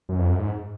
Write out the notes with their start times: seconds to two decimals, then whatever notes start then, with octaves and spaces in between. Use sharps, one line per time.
0.09 F#2
0.18 F2
0.29 F#2
0.39 G#2